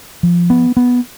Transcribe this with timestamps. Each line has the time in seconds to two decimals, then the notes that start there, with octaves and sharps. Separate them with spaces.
0.23 F3
0.50 B3
0.77 B3